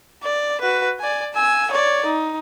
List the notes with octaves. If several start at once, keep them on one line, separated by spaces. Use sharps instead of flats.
D5
F#4 B4
D5 G#5
G#5 E6
C#5 D5
D#4